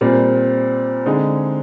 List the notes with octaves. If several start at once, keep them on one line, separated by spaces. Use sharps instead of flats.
A#2 G3 C4
D3 G#3 C4 D#4 G#4